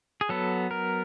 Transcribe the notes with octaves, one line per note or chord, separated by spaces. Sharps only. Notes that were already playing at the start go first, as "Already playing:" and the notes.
G#4
F#3 B3 A4
A#4